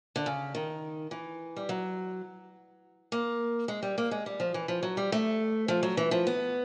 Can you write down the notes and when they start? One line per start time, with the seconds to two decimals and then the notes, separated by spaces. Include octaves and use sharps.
0.16 D3
0.26 C#3
0.55 D#3
1.11 E3
1.56 G3
1.69 F#3
3.12 A#3
3.68 G#3
3.83 G3
3.98 A#3
4.11 G#3
4.26 G3
4.40 F3
4.54 E3
4.68 F3
4.83 F#3
4.97 G3
5.12 A3
5.68 F3
5.83 F#3
5.97 E3
6.11 F3
6.27 B3